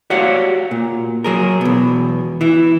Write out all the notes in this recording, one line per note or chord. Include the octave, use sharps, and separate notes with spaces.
F#4 G4 C#5 D5 F5 F#5
A#2
F#3 G#4 A#4
E2 B2
E3 E4